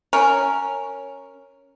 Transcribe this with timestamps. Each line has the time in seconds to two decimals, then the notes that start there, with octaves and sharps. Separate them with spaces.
0.13 C#4 A#4